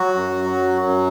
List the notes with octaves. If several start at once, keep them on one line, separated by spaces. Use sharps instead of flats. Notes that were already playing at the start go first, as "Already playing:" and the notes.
Already playing: F#3 F#4
F#2
F#3
F#2